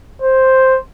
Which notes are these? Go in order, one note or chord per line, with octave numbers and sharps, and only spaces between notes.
C5